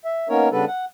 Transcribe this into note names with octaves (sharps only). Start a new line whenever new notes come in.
E5
A#3 B3 C#4 D#4 A#4 C#5
C#3 G3 B3 D4 A4 B4
F#5